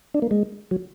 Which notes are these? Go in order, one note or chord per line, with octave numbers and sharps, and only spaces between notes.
D4
A#3
G#3
F#3